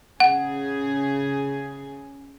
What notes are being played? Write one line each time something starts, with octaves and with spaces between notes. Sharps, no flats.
C#3 G#4 F#5